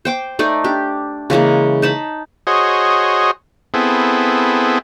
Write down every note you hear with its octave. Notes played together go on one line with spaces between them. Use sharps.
C5 G5 D6
A3 D#4 D5
D4 G4
C#3 E3 G#3 A#3
D#4 A5 B5
F#4 G#4 C5 C#5 D#5
B3 C4 E4 G#4 A4